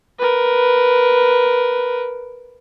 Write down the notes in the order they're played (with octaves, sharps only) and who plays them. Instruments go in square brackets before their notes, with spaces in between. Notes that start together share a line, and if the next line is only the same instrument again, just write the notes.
[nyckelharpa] A#4 B4